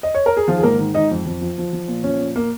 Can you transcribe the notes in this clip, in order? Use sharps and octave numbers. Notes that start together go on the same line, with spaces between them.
D#5
C#5
A#4
G#4
D#3 F3 F4
G#4
G#2 A#3 A#4
D#3
G#2 D#4 D#5
F2
F2
F3
F3
F3
A#2
F3 C#4
A#2
A#3